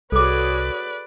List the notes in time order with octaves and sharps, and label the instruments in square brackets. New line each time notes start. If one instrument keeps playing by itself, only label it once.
[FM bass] C2 [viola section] F#4 G#4 C#5 [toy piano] A4 D6 [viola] B4 D5